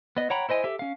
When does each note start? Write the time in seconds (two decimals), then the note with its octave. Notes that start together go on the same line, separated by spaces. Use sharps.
0.17 B3 D#5
0.30 C#5 F#5 G5 A#5 B5
0.49 E4 C5 D#5 G#5
0.64 G4 A4 E5
0.79 C#4 F5